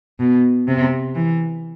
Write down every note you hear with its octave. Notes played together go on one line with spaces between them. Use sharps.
B2
C3
E3